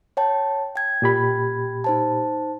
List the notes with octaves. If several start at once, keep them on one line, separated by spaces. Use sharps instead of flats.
C#5 G5 A5
G5 G#6
A#2 G4 B5
D#4 C5 A5